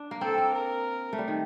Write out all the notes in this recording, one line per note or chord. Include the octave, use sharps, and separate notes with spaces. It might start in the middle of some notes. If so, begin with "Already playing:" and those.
Already playing: D4
A#3
C4 A4
A#3
A#4
A3
G3
D#3